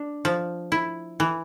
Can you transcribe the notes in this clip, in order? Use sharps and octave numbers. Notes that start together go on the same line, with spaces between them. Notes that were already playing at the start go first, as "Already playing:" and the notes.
Already playing: D4
F3
E4
E3